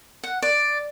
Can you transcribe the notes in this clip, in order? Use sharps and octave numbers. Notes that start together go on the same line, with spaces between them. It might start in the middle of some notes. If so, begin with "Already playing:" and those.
F#5
D5